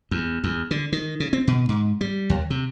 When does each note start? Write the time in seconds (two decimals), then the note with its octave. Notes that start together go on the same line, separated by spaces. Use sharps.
0.11 E2
0.44 E2
0.71 D3
0.92 D#3
1.20 C#3
1.33 C4
1.47 B2
1.69 G#2
2.01 G3
2.30 D#2
2.50 C3